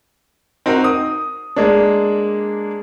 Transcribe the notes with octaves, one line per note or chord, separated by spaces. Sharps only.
C4 D#4 F#4 A#4
D#6
G#3 A#3 D4